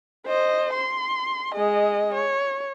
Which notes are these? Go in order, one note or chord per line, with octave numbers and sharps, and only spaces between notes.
C5 D#5
C6
G#3 D#5
C#5